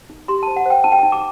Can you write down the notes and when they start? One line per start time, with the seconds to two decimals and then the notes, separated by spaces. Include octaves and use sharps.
0.10 D#4
0.28 G4 C6
0.43 C5 A5
0.56 F#5
0.66 C5 G5
0.84 D#4 A5
0.92 G5
0.99 A5
1.03 D#4
1.12 D6